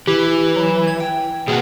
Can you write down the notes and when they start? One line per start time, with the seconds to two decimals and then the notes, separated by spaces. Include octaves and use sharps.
0.07 E3 G4
0.56 F#3
0.87 G#6
1.00 G5
1.48 B2 A#3 F#4 G#4